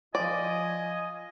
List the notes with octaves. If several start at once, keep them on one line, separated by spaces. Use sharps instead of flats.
F3 F4 D5 D#5 G#5